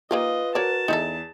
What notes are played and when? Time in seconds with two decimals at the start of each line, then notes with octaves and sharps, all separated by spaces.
0.11 A#3 D#4 F4 G4 B4 D#5
0.55 F#4 A#4 C#5 D5 A5
0.88 E2 D#4 E4 A4